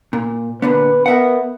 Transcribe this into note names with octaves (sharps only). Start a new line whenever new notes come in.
A#2
A#2 D3 B3 B4
B3 A#4 E5 F#5